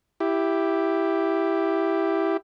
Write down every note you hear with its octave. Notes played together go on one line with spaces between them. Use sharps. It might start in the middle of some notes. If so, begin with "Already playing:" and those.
E4 G4